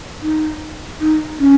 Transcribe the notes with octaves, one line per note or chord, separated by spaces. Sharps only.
D#4
D#4
C#4